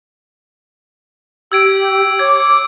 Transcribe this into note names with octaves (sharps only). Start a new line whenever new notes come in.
G4 E6 G#6 D7
C#5 D6 G#6